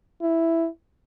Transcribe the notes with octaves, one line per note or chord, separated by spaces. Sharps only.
E4